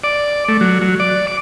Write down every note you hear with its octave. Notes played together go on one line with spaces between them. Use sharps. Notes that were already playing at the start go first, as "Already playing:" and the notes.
D5
A3
F#3
F#3
D5
D6